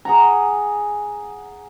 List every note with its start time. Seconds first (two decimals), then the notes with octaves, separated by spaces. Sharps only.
0.05 G#4 F#5 A#5